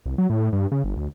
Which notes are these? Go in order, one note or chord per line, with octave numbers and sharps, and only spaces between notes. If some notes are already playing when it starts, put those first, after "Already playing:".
C2
F#3
A2
G2
C#3
G1
D2